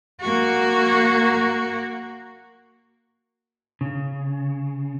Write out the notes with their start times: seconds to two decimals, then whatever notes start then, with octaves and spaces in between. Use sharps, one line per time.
0.21 A#3 F#4
3.81 C#3